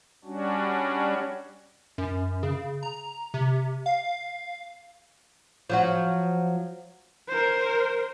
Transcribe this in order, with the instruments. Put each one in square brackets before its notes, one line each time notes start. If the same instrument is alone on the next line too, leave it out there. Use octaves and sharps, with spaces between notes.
[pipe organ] G3 C#4 D4 F#4
[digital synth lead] F#2
C#3
A#5
C3
F5
[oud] F3 F#3 F#4
[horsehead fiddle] A#4 C5